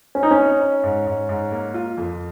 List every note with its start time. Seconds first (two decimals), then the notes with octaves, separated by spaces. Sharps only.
0.15 C4 C#4
0.23 D#4
0.31 C#4
0.37 D#4
0.61 D#4
0.83 G#2
1.06 G#2
1.29 G#2
1.52 A#3
1.74 F4
1.97 F2